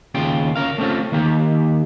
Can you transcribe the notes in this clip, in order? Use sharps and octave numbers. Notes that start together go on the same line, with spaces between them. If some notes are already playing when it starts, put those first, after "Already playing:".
D#2 C#3 F4 G5
C#4 A#4 F5
A3 C4 C#4 F4
D#3 A#3 G4